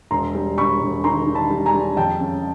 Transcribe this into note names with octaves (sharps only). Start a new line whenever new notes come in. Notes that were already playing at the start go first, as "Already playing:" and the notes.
E1 A#5 C6
G3
E1 B5 C#6
E1
D#3 A#5 C6
D#3
A5 B5
G3
G#5 A#5
G3
F2 G5 A5
C#3